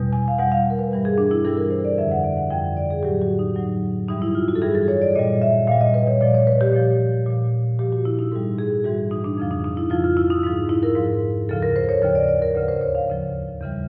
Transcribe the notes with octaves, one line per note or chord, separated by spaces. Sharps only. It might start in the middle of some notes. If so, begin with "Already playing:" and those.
Already playing: E2 B2 G3
G#5
F5
E2 B2 G3 F#5
F5
A#4
B4
G2 E3 G3
G#4
D4
E4
G2 E3 G3 A4
A#4
C5
D5
F2 D3 F3 E5
F#5
D5
F#5
F2 D3 F3 G5
F#5
D5
G#4
A2 F#3 G4
F#4
D#4
A2 F#3
G2 E3 G3 D#4
E4
F4
F#4
A4
G2 E3 G3 G#4
A4
C#5
D5
A#2 G3 D#5
E5
A#2 G3 F5
D#5
B4
C#5
A#2 F3 D5
C#5
B4
G4
A#2 F3
A#2 F3
A#2 F3 G4
F#4
E4
D#4
G#2 E3 G3 A4
G#4
G#2 E3 G3 F#4
D#4
D4
F2 C#3 F3
D#4
D#4
E4
F2 C#3 F3 F4
F4
E4
D#4
G#2 F3 D#4
E4
A#4
G#2 F3
D#2 C#3 F3 A4
A#4
C5
C#5
D#2 C#3 F3 C#5
D5
D5
A#4
D2 C#3 F3 B4
C5
C#5
F5
D2 C#3 F3
E2 C#3 E3 G3